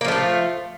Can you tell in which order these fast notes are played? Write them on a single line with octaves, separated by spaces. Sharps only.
A#3 F3 A3 F4